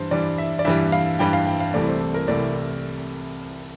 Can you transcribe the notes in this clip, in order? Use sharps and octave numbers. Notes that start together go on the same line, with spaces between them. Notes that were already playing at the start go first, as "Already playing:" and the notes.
Already playing: G2 E3 G3 C5
G2 E3 G3 D5
E5
D5
G2 E3 G3 E5
F5
G2 E3 G3 G5
F5
G5
F5
C2 C3 E3 A3 D5
C5
A4
A#4
C2 C3 E3 A3 D5